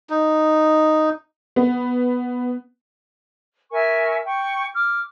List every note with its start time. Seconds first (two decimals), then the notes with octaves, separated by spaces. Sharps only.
0.10 D#4
1.56 B3
3.72 A#4 E5 G#5 C#6
4.25 G5 C#6
4.73 D6 F6